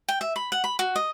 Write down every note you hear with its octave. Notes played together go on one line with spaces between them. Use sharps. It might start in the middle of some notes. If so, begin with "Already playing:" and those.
G5
E5
B5
F#5
B5
F#4
D#5